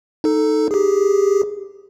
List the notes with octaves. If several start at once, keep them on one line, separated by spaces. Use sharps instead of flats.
D#4 A4
G4 G#4